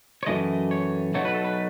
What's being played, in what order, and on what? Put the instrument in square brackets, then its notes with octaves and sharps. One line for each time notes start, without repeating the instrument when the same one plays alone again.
[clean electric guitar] C#5
F#2 E3 A3 D#5
C#5
B1 B2 F#3 A3 C#5
B4
A4
B4